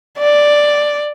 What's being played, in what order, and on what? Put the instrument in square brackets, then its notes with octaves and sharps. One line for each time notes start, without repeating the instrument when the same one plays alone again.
[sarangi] D5